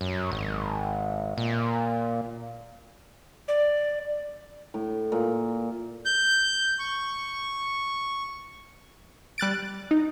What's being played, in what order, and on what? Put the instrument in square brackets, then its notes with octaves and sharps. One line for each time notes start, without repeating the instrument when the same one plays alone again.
[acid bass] F#2
G#1
A#2
[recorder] D5
[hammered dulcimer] A2
A#2
[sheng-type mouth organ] G6
C#6
[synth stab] G3 F#6 A6 D7
D#4